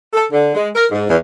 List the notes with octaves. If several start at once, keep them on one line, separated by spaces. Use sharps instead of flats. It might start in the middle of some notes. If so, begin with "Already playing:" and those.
A4
D3
G#3
A#4
G#2
E2